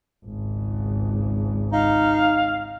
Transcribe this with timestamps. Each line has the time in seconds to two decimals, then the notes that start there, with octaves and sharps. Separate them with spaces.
0.25 G#1 C#2
1.72 D#4 F5